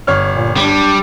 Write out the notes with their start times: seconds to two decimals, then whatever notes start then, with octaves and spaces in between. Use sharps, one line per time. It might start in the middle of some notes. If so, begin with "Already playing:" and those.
0.07 G1 C#5 F6
0.34 A#2
0.57 G3 D4